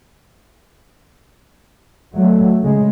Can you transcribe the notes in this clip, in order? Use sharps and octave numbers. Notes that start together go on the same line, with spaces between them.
F#3 A3
C#3 G#3